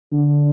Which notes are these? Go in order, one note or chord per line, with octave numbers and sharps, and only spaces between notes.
D3